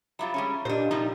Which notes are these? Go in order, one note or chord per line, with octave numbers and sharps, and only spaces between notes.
F#3 G3 F4 E5 A#5 B5
G3 G#3 C#4
A#2 D4 G4 C5 D#5
C3 F3 G3 D#4 A#5